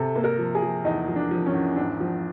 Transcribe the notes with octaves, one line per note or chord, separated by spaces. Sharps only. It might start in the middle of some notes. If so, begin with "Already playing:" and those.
Already playing: C3 A4
A#3
A#4
F3
G#4
F3
E2 D#4
F3
D4
F3
C#4
E2
G#1 D4
F3